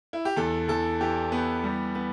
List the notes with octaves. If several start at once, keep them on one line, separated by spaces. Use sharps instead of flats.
E4
G4
E2 A4
E2 A4
E3 G4
B3
G3
B3